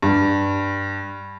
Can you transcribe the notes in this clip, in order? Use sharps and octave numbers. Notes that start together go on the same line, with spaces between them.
G2